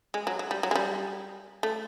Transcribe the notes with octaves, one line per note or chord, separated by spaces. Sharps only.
G#3
F#3
F#3
G3
F#3
G#3
G3
A3